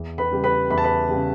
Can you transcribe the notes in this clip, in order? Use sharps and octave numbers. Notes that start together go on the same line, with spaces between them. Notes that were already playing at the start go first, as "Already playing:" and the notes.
Already playing: E2
B4 B5
C#3 G3
B4 B5
E2 B5
A5
B4 B5
C#3 G3